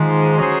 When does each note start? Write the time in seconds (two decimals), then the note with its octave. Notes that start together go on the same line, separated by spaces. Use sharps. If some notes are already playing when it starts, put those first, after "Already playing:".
Already playing: G#2 D#3 F3 G#3
0.37 F#3 C#4 G#4 C5